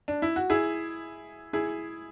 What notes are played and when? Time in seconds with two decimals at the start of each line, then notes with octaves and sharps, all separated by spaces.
0.08 D4
0.22 E4
0.36 F#4
0.50 E4 G#4
1.53 E4 G#4